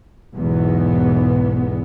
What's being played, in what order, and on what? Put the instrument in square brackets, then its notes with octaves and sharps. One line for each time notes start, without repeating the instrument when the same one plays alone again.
[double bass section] B1 E2 G#2 E3 B3